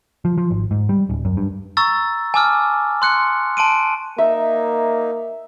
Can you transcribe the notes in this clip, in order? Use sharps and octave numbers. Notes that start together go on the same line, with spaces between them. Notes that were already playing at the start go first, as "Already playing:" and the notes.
F3
F3
G#1
G#2
G3
D1
F#2
G2
A#5 C#6 E6 A6
G#5 A5 D6 E6 F6
C6 F#6 C#7
A5 C6 D7 D#7
A#3 D#4 E5